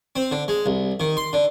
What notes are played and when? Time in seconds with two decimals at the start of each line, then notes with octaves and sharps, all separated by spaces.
0.16 C4
0.32 D3
0.48 G#3
0.66 C2
1.00 D#3
1.17 C6
1.33 D3